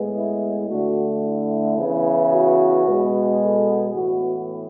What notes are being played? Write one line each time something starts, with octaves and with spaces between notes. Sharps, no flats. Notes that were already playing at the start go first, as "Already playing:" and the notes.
Already playing: A2 G#3 B3
E4
D3 A3 F#4
E4
C#3 E3 B3
F#4
B2 G#3 B3
A4
A2 E3 B3 F#4